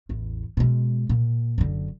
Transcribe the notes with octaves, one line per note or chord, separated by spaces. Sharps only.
A1 E2
B2 G#3
A#2
F#1 D3